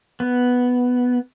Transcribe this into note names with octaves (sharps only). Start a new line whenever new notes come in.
B3